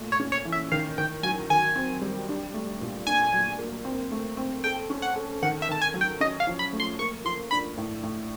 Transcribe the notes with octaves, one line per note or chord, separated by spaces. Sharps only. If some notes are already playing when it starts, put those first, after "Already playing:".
Already playing: A#2 A3
C#5
C#4
C#5
E3
E5
D#3 F5
D#3 G5
F#3 G#5
D#3 G#5
C4
G3
D4
A3
A#2
D4 G#5
F#3
A#3
C4
A3
C4
A4 G5
C#4
F#5
A4
D#3 F#5
E5
D#3 A5
G#5
F#3
G5
C#4 D#5
F5
F3
B5
A3
C6
A#3 C#6
F3 C6
D4 B5
A2
A2